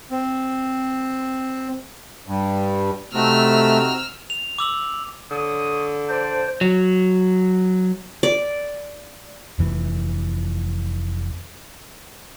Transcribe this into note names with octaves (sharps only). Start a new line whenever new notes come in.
C4
G2
C3 A3 C4 D#4 F#4 E6 F6
F7
D6 E6 F#7
D3 C#5 D#6
C5 D5 A5 C6
F#3
D5
F1 E3